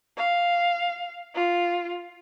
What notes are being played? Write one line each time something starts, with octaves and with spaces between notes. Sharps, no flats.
F5
F4